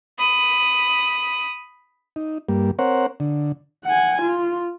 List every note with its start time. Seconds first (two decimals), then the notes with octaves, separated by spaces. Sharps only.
0.18 B5 D#6
2.16 D#4
2.49 G2 G3 A#3
2.79 C4 A#4 C5 C#5 F#5
3.20 D3
3.86 F#5 G#5
4.22 F4